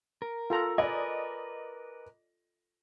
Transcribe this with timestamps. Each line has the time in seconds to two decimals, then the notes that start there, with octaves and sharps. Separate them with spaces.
0.22 A#4
0.50 F4 A4 A#5
0.78 A#4 B4 D5 D#5 G#5